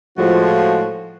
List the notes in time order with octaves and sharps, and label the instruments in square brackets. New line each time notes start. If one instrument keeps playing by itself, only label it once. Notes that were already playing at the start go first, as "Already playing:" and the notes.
[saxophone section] A2 G#3 [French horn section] F3 [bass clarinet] F#4